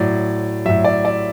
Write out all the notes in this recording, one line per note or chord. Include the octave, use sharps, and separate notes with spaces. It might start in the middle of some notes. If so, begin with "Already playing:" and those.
Already playing: A2 F#3 D5
A2 F#3 E5
D5
D5